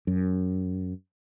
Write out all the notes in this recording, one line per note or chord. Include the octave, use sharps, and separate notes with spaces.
F#2